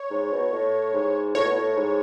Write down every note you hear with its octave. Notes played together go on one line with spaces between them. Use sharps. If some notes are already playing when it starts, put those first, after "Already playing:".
Already playing: C#5
G#2
B2
A2
G#2
A2 C#5
B2
A2
G#2